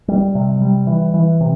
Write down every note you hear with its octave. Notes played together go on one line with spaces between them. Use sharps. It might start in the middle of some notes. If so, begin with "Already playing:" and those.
G3
C3
G3
E3
E3
C3